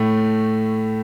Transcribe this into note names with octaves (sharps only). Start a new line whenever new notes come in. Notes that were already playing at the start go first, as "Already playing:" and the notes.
Already playing: A2 A3